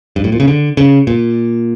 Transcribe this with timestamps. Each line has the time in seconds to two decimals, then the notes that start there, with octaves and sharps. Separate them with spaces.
0.16 G2
0.24 A2
0.32 A#2
0.40 C#3
0.48 D3
0.77 C#3
1.07 A#2